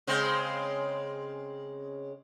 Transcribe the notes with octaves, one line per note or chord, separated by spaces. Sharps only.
C#3 G#3 C4